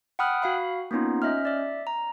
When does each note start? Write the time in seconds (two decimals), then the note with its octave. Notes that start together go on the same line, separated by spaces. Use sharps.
0.19 F#5 G5 B5 D#6 F6 F#6
0.42 F#4 F5 B5
0.91 A#3 B3 C#4 D#4 F4
1.22 C#4 D#5 E5 F6
1.45 D5 E5
1.87 A#5